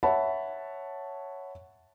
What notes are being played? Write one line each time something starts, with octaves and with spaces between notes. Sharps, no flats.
C#5 E5 F#5 A5 B5